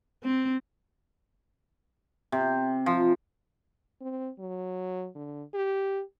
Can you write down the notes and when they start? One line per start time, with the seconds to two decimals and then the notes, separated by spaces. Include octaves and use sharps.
0.23 C4
2.32 C3
2.86 F3
4.01 C4
4.39 F#3
5.15 D3
5.54 G4